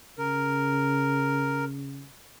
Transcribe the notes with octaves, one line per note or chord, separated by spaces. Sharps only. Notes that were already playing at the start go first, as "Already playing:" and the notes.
C#3 A#4